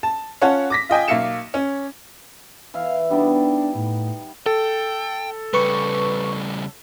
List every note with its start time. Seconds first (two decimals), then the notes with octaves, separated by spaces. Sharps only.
0.03 A5
0.42 C#4 F4 C#5 F#5 A5
0.70 D6 A#6 B6
0.89 F4 D#5 G5 G#5
1.08 B1 A#3 E5 F5 C#7 E7
1.54 C#4
2.74 E3 E5 F5
3.10 G3 B3 D4 D#4
3.75 A2
4.46 A4 G5
5.54 C#3 G3 B4 C#6